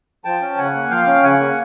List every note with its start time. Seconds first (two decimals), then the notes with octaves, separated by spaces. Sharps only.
0.25 F3 G5 A5
0.41 C#4
0.58 C#3 F#5 G#5
0.75 A#3
0.90 F3 F5 G5
1.07 C#4
1.23 C#3 F#5 G#5
1.40 A#3